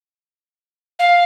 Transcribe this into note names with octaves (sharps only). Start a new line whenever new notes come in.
F5